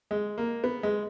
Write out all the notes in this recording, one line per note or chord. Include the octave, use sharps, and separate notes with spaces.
G#3
A#3
B3
G#3